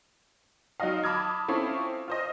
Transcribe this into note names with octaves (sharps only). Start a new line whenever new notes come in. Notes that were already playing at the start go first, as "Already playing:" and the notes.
F#3 D#4 F4 D#5 F5
A5 B5 D6 D#6 F6 G#6
C4 C#4 E4 F4 A4
F4 C5 D#5